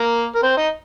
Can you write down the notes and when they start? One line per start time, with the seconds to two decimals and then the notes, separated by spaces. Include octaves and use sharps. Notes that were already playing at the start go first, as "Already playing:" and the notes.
Already playing: A#3 A#4
0.35 A#4
0.43 C4 C5
0.57 D#4 D#5